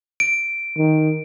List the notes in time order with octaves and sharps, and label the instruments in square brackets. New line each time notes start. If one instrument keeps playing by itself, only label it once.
[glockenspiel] D7
[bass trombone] D#3